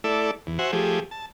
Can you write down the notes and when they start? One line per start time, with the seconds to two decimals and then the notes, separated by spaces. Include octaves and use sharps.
0.04 A3 E4 A4 D5
0.47 E2
0.59 F#4 C5 E5 F#5 G#5
0.72 F3 A3 G4 G#4
1.11 A5